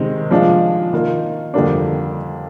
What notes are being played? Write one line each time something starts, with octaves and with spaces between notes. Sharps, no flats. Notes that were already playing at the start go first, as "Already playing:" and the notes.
Already playing: C3 D#3 G#3 C4
F3 G#3 D4 F4
D#3 A#3 F4
F2 D3 G3 A#3 D4